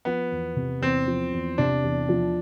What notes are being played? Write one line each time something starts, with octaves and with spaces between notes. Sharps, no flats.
F3 B3
E2
C3
E2 C4
F3
E2
C3 D4
E2
F3